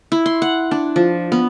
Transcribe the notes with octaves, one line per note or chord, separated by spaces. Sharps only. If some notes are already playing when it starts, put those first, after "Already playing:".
E4
C6
F#5
D4
F3
B3